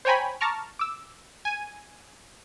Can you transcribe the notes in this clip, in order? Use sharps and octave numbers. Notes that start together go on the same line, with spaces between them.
C5 C#5 G5 G#5 A#5 B5
A5 A#5 C#6 D6 F6
D6 E6
G#5 D#7